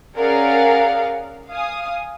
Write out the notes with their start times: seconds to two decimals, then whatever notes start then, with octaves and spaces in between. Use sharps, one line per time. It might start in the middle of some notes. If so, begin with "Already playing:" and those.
0.17 C#4 G#4 A#4 D5 F5 F#5
1.49 F5 G#5 D#6